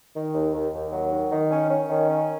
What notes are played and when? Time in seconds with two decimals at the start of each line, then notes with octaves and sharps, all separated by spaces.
0.16 D#3
0.34 D#2
0.54 D#2
0.74 D#2
0.92 F#3
1.12 D#3
1.31 D#3
1.51 C#4
1.70 C#4
1.90 D#3
2.09 C#4